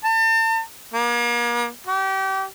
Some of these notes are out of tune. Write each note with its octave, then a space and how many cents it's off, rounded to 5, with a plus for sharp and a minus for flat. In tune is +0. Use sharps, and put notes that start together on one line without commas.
A5 +40
A#3 +40
G4 -30